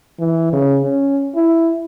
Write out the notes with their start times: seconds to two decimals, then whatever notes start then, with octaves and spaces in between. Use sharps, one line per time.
0.19 E3
0.53 C#3
0.84 C#4
1.35 E4